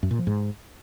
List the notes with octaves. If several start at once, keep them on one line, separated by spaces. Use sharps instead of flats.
F#2
A#2
F3
G#2